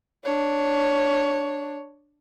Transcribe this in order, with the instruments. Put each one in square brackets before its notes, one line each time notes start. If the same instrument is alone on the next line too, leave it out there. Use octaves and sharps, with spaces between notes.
[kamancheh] D4 C#5